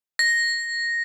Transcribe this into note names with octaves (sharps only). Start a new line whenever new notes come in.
A#6